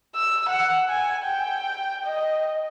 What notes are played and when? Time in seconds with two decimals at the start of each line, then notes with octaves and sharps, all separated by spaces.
0.16 E6
0.49 F#5
0.89 G#5
1.25 G5
2.05 D#5